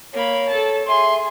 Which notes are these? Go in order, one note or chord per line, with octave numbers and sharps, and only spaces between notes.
A#3 C#5 B5
A4 A5
G#4 E5 C6